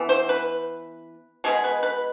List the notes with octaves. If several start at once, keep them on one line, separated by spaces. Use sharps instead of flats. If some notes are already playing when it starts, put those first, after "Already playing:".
Already playing: E3 B3
C5
B4
B2 G#3 B3 G#4
B4
B4